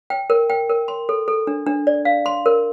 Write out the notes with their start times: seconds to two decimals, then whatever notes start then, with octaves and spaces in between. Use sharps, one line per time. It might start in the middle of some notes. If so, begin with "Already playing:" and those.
0.10 G5
0.30 A#4
0.50 G5
0.70 A#4
0.88 C6
1.09 A4
1.28 A4
1.47 D4
1.67 D4
1.87 D5
2.05 F5
2.26 C6
2.46 A#4